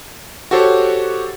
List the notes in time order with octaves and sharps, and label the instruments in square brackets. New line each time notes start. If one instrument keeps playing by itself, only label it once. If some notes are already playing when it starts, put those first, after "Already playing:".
[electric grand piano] F#4 G4 A4 C5 C#5